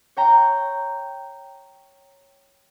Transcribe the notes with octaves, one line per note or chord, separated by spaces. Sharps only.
C#5 G5 A#5